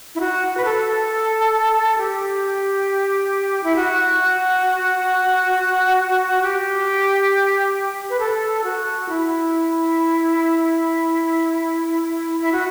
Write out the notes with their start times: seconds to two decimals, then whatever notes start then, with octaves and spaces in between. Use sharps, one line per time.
0.15 E4
0.20 F#4
0.57 B4
0.65 A4
1.98 G4
3.64 E4
3.76 F#4
6.42 G4
8.10 B4
8.19 A4
8.64 F#4
9.09 E4
12.40 E4
12.52 F#4